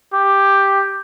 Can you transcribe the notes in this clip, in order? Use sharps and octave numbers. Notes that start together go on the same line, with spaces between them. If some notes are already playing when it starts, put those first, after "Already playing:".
G4